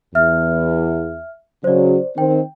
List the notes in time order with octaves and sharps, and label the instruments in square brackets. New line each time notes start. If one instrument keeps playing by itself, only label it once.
[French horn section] E2 [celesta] E5 F6
[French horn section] C#3 F#3 [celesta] C5 D5
[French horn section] D#3 C4 [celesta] G5